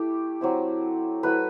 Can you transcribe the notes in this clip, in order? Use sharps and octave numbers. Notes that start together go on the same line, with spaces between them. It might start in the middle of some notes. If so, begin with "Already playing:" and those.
Already playing: A3 E4 G4
F#3 C4 E4
F#3 A3 E4 B4